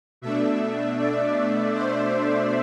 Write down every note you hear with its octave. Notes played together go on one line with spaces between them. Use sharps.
B2 A3 D4 E5
D5
C5